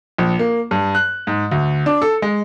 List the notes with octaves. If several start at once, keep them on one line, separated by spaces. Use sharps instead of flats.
A#1
A#3
G2
F#6
G#2
D2
D4
A4
G#3